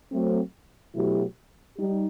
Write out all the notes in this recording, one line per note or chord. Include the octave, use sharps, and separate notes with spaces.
F#3 A3 C4
B2 F#3 A3 E4 G4
G3 D#4 G4